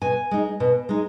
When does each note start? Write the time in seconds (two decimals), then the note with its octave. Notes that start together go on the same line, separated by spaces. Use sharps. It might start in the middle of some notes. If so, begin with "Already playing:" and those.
0.02 B2 G#5
0.31 G#3 D#4
0.60 B2
0.89 G#3 D#4